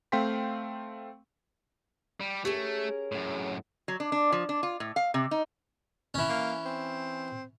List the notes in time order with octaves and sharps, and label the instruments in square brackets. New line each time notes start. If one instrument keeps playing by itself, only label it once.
[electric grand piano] A3 C4 F5 G5 C6 B6
[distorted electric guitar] G3
[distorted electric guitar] A3 [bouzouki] C#4 G#4 A#4 [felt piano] G4
[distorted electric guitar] F#2 A2
[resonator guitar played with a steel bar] F#3
D4
D4
F3
D4
F4
A2
F5
C3
D#4
[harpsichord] E3 C#4
[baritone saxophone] A#3
C4